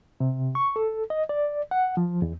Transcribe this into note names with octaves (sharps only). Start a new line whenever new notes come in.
C3
C#6
A4
D#5
D5
F#5
F3
E2